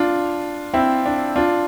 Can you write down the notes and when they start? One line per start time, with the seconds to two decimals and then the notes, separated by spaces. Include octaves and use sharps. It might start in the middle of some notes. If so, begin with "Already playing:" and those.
Already playing: D4 F4
0.74 C4 E4
1.06 D4
1.36 D4 F4